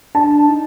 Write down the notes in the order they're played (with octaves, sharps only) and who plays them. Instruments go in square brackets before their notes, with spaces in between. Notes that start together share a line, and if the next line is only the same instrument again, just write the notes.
[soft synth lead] D4 [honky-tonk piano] A5
[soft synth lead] D#4